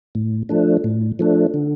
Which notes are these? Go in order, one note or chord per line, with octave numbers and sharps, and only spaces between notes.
A2
F3 A3 D4
A2
F3 A3 D4
D3